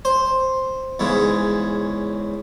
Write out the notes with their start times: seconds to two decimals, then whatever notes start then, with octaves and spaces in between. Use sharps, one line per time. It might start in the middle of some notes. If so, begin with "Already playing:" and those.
0.05 C5
0.99 E2 G#2 C#3